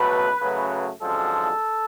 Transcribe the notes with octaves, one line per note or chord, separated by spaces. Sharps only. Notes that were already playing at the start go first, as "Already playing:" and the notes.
Already playing: C#2 B2 F#3 A3 B4
F#2 C#3 F#3 A3
G#1 F#2 D3 F3 G#3 A4